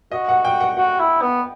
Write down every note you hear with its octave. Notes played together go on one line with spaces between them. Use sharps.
F#4 D#5
F#5
G5
F#5
F#4 F#5
E4
B3